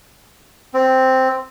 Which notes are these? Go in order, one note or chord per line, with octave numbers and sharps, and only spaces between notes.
C4